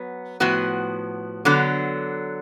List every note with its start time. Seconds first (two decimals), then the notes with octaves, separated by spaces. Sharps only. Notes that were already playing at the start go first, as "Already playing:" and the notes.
Already playing: F#3 B3
0.40 A2 F3 B3 F#4
1.45 D3 F#3 B3